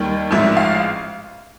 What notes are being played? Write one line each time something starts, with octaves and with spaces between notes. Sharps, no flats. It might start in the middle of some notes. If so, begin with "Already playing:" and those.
Already playing: D#2 D#3 G3
A1 G#2 F3 E5
F5